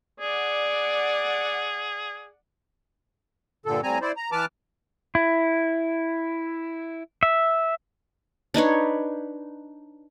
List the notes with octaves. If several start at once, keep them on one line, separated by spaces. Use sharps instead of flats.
G#4 D5 F#5
G2 A#2 D3 A4
A2 G3 C4 G#5 A#5
E4 C5 D5
A#5
E3 B4 A5 D6 F6
E4
E5
D4 D#4 B4 C#5